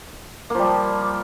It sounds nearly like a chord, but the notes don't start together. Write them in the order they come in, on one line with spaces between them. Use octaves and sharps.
A#3 F3 G3